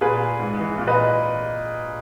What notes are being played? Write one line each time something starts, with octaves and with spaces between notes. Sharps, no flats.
A#2 G#4 B4
G#2
E3
A#2
B4 D#5